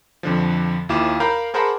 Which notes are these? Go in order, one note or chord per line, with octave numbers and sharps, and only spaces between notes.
F2 D3 F3
D#2 E4 F4 D6 E7
A#4 F5 A#5 B5 G6
G#4 A#4 C5 F#5 A5 B5